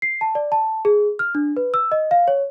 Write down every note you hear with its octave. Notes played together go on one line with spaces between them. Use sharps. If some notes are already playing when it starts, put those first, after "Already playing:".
C7
A5
D5
A5
G#4
F6
D4
B4
E6
D#5
F5
C#5